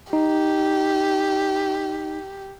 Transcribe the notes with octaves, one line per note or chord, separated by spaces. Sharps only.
D#4 G4